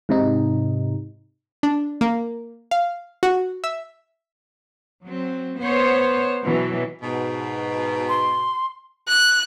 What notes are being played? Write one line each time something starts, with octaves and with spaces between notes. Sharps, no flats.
G#2 C3 D#4
D4
A#3
F5
F#4
E5
F#3 C4
B3 C5 C#5
B2 E3 F#3
G#2 B2
C6
F#6